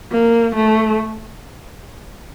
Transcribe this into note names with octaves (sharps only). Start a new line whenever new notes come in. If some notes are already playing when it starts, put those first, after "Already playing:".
A#3
A3